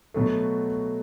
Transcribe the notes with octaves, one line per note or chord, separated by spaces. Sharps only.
B2 F#3 A3